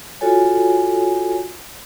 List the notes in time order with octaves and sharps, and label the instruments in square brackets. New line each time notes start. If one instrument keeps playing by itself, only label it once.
[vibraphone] F4 F#4 A4 C#5 G#5